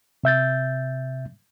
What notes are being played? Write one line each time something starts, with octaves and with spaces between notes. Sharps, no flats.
C3 E5 G6 A6